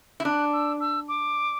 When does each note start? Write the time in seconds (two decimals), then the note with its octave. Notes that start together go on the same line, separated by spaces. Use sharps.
0.20 E4
0.25 D4 F#6
0.53 E6
0.80 E6
1.08 D6